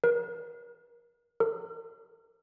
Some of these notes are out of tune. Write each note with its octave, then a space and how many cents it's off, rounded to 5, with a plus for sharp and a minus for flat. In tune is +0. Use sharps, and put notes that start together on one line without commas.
A#4 +40
A#4 -40